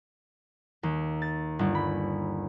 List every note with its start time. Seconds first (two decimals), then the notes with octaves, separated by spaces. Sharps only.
0.83 D#2
1.22 A6
1.59 G1
1.75 B5